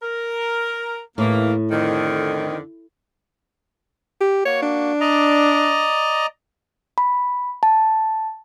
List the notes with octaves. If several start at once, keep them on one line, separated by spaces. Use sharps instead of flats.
A#4
D#2 A2 E3 A#3
F2 D3 D#3
G4
A#3 F#4 C#5
D4
D5 D#5 A#5
B5
A5